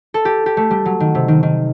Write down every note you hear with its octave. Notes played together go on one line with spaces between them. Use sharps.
A4
G4
G4
A3
G3
F#3
D#3
C3
D#3
D#3